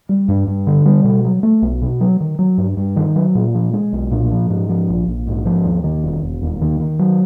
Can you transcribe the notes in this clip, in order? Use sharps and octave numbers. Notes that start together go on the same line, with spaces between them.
G3
G2
G2
D3
G3
B2
F#3
A3
B1
B2
F#3
D#3
F#3
G2
G2
D#3
F#3
A#2
F3
G#3
B1
A#2
F3
G#2
F3
A#1
A#1
G#2
F3
D#2
D#3
E1
E1
D#2
D#3
D#3
F#3